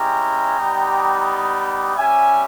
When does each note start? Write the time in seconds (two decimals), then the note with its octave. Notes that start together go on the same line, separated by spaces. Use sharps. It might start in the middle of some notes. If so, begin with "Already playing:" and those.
Already playing: G#3 C#4 E4 G4 G5 A#5
0.58 G3 B3 D#4 G4
1.96 G3 C#4 G4 E5 G#5